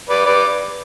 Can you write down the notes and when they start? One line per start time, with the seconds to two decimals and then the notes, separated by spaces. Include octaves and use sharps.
0.09 B4 D5
0.26 B4 D5